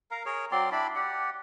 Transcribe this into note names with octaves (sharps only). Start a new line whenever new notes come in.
A#4 F5 A#5
G#4 A#4 C#5
F#3 C4 D5 C6
D4 E4 D5 B5
G4 D5 F#5